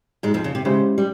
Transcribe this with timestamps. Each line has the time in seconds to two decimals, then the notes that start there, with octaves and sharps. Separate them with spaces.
0.23 G#2 G#3
0.34 F2 F3
0.44 C#3
0.55 C3
0.65 C#3 G#3 C#4 E4 G4 C5
0.98 G3